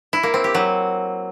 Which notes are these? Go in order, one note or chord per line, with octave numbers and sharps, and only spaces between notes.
E4
A#3
C4
G4
F#3